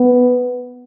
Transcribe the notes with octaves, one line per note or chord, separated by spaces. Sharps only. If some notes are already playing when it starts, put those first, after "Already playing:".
Already playing: B3